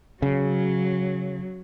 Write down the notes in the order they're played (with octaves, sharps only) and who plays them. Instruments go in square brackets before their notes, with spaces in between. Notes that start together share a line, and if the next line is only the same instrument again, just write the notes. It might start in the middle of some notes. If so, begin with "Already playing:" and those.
[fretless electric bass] C#3 [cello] F#3